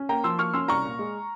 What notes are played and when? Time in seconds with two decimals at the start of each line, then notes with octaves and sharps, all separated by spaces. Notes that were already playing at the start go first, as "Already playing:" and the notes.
Already playing: C#4
0.09 A#3 G5 A#5
0.24 F3 C6 E6
0.39 A#3 C#6 F6
0.54 C#4 C6 E6
0.68 C2 A#5 C#6
0.84 A#2
0.99 G#3